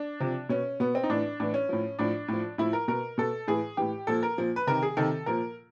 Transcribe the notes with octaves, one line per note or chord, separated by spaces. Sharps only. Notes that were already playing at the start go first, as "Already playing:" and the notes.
Already playing: D4
C3 F3
B2 C#4
B2 B3
C4
D#4
A2 E3 D4
A2 E3 D4
C#4
A2 F3
A2 F3 D4
A2 F3
A2 F3 E4
A#4
B2 A#4
B2 A4
A2 E3 G#4
A2 E3 G4
A#2 F3 A4
A#4
A#2 F3
B4
C3 D#3 A#4
G#4
C3 D#3 A4
A#2 F3 A#4